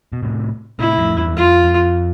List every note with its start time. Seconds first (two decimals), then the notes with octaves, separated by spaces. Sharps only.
0.13 B2
0.23 A2 C3
0.79 A2 C3 E4
0.98 F2 A2
1.16 E2 G2
1.36 F2 F4
1.64 F2